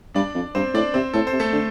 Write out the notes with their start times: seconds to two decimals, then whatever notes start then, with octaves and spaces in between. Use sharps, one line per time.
0.14 G2 D4 D5
0.35 F2
0.55 G2 C4 C5
0.74 A2 D4 D5
0.94 C3 C4 C5
1.13 A2 A4
1.27 C5
1.32 C3
1.40 A3 A4
1.53 D3